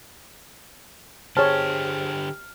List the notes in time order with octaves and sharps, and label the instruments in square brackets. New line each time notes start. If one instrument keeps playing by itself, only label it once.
[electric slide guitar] D3 G4 [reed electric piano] G#4 C5 [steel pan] C#5 A5 [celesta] F6